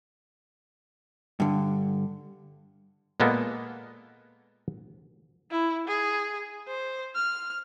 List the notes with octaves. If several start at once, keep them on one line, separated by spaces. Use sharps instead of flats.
G2 D3
A#2 G#3 A#3 B3 A4
E4
G#4
C5
F6